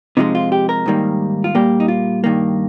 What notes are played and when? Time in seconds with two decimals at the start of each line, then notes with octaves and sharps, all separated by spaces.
0.17 C3 F3 G#3 D#4
0.35 F4
0.52 G4
0.69 A#4
0.86 G#2 D#3 G3 A#3
1.44 F4
1.55 A#2 G3 A#3 G4
1.80 D#4
1.88 F4
2.24 G2 D#3 A#3